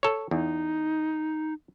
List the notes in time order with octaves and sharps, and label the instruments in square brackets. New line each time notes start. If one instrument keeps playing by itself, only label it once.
[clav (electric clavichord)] A4 C#5
[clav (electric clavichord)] E2 [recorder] D#4